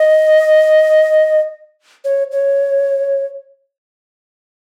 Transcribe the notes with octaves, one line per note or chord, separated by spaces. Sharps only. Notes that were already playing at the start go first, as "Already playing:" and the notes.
Already playing: D#5
C#5
C#5